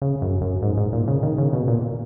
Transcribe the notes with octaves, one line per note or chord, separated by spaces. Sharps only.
C#3
F#2
F#2
G#2
G#2
A#2
C#3
D#3
C#3
B2
A#2